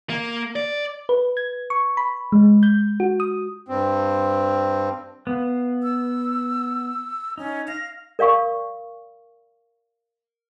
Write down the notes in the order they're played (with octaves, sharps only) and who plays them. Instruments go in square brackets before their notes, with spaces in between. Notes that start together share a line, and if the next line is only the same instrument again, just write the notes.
[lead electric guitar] A#3
D5
[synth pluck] B4
G#6
C#6
B5
G#3
G6
F#4
D#6
[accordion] G2 C4
[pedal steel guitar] B3 [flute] F5
[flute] E6
[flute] C#4 [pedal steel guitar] D#4
[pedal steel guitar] F5 [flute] A#6
[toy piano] A#4 D5 F5 C#6 D#6